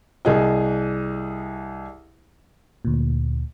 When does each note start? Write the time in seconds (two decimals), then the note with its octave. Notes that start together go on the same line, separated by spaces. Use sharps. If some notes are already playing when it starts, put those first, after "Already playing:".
0.25 C2 G#4 D#5
2.85 D2 A#2